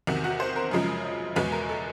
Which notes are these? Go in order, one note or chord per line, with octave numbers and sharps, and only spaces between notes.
E2 C3 D#3 F#4
F#4
C5
A#4
F#2 C#3 F3 G#3
E2 B2 G#3 B4
A#4
A4